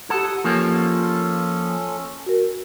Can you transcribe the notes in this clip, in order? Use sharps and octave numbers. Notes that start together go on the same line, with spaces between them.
G4 A4 F#5 D#6 G#6
F3 A#3 C#4 A4
F#4 A#4